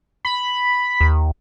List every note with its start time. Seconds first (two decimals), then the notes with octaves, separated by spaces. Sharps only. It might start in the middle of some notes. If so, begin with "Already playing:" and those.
0.25 B5
1.01 D#2